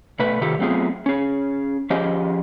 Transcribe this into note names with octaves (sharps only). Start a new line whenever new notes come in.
B2 A3 B4
C3 D#3 F4 G4 A4
F#3 A3 B3 C4 F4 G#4
C#4 G#4
F3 C#4 G4 G#4 D#5